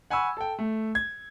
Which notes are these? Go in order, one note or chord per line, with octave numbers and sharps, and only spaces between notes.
F#5 G#5 B5 C#6 E6
A4 G5
A3
G#6